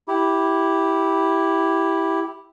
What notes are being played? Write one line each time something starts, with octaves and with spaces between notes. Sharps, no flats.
E4 G4